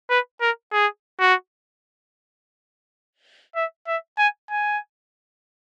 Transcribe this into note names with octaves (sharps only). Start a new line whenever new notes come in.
B4
A#4
G#4
F#4
E5
E5
G#5
G#5